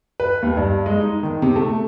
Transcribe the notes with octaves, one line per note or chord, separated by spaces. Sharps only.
B4
D#2
G2
G#3
D#4
D#3
C3
A3